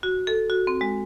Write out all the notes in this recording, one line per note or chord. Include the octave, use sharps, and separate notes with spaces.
F#4
A4
F#4
C4
G#3